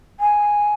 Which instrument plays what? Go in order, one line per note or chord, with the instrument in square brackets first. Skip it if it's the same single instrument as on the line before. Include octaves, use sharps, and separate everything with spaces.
[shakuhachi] G#5